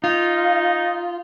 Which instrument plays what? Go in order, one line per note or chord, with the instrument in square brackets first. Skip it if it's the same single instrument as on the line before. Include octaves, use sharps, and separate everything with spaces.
[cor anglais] D#4 [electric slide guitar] F4